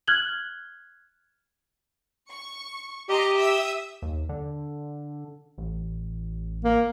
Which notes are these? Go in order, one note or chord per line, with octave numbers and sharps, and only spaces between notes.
F6 F#6 G#6 F#7 G7
C#6
G4 D#5 A#5 C6
E5 D#6 E6
D#2
D3
A1
A#3